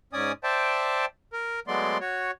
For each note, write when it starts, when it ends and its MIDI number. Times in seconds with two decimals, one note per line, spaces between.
0.13 0.32 44
0.13 0.32 61
0.13 0.32 74
0.13 0.32 80
0.13 0.32 87
0.44 1.05 72
0.44 1.05 74
0.44 1.05 76
0.44 1.05 79
0.44 1.05 81
1.33 1.60 70
1.68 1.98 54
1.68 1.98 56
1.68 1.98 57
1.68 1.98 59
1.68 1.98 74
1.68 1.98 84
2.01 2.31 66
2.01 2.31 73